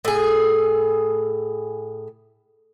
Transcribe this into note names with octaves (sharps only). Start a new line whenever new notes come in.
A2 G#4